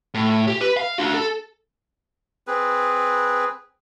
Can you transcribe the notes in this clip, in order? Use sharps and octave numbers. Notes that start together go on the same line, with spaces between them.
A2
G4
B4
F5
D4 F#4
A4
C4 G#4 B4